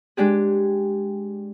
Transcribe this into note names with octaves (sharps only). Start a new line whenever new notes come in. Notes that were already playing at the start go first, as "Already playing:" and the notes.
G#3 D4 G4 G#4